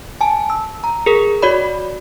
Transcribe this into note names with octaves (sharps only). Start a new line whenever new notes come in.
G#5 A5
E6
A#5
G#4 A#4
F#4 C#5 D5 B5